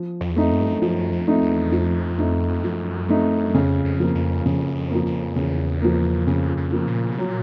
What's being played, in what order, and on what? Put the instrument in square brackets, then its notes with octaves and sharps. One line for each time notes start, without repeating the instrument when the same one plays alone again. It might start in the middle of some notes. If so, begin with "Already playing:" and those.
Already playing: [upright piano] F3
[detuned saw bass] F2
E2
[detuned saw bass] F2 [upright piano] A3 C4 D#4
[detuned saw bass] F#2
G2
F#2
[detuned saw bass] F#2 [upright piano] F3
[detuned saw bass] F2
[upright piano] A3 C4 D#4
[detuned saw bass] E2
[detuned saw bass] F2 [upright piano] F3
[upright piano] A3 C4 D#4
[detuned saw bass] F#2 [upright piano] F3
[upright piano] A3 C4 D#4
[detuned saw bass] F2 [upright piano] C#3
[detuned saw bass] F2
[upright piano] F3 A#3
[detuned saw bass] F2
[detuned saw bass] F2 [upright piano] C#3
[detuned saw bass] F#2
F2
[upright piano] F3 A#3
[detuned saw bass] F2
[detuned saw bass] E2 [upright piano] C#3
[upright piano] F3 A#3
[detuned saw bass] F2 [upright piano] C#3
[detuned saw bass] F2
[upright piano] F3 A#3
[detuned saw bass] A#2
B2
[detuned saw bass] A#2 [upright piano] F#3